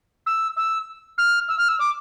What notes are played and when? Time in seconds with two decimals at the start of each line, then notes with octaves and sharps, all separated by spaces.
0.26 E6
0.56 E6
1.18 F6
1.48 E6
1.58 F6
1.68 E6
1.79 D6